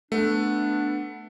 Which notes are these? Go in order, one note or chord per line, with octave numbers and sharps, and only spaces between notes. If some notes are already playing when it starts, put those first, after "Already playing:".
A3 B3 D4